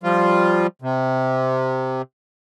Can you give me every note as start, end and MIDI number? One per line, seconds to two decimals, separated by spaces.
0.03 0.67 53
0.03 0.67 55
0.03 0.67 65
0.82 2.02 48